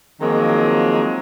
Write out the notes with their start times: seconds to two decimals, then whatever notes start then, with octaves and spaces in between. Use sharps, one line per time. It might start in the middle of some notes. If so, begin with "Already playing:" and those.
0.21 D#3 F3 F#3 G#3 A#3 C4